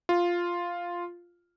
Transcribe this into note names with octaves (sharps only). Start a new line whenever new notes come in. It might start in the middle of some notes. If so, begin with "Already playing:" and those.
F4